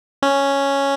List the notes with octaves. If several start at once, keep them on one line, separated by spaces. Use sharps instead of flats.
C#4